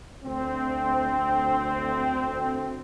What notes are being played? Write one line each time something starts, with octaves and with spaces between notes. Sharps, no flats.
D2 C4